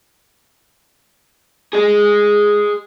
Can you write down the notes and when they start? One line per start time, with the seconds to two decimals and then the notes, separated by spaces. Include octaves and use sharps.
1.73 G#4 D#5